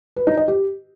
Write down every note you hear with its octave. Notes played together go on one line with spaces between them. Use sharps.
B4
D#4
D#5
G4